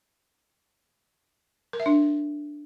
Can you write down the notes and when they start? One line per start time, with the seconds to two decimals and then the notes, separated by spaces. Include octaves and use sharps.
1.73 A#4
1.80 E5
1.86 D4